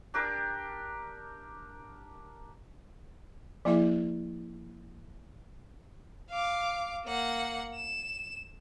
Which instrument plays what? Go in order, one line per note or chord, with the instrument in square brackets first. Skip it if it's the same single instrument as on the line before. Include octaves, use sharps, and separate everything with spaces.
[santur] D4 G4 A#4 D5
[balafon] F3 A#3 E4 G#4 E5 D6
[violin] F5 D6
A#3 F#5
E7